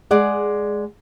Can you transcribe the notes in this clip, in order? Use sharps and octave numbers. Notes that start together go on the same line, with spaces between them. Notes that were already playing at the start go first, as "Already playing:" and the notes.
G#3 G#4 D5 F#5